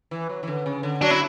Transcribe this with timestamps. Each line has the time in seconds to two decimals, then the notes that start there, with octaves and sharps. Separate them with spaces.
0.11 E3
0.29 F#3
0.43 E3
0.48 D3
0.66 C#3
0.83 D3
1.01 F#3 D4
1.11 E4